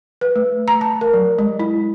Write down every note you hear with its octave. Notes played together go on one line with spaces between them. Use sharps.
B4
A3
A#5
A5
A#4
F#3
G#3
E4